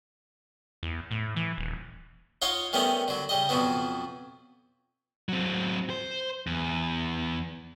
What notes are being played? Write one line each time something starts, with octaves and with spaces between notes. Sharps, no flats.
E2
A2
E3
D#1
D#4 F4 C#5 F5 F#5
D#3 G3 A3 B3 C#4 D#4
D3 F#3
C#3 G3 D#5
F2 B2 F3 F#3 B3
F#3 C4
C5
E2